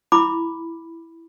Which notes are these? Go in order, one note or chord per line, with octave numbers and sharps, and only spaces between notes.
E4 B5 D6